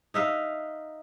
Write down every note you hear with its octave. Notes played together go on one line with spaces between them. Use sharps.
D#4 E5 F5